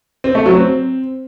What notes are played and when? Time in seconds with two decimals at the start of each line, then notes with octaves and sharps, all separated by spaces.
0.24 C4
0.35 A3
0.46 F#3
0.57 C4